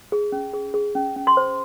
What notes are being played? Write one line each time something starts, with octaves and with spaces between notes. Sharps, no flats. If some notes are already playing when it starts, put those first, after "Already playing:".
G#4
C#4
G#4
G#4
C#4
C#4
C6
C5